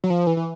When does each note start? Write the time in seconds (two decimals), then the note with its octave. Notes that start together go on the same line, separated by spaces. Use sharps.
0.04 F#3
0.10 F3
0.27 E3
0.37 E3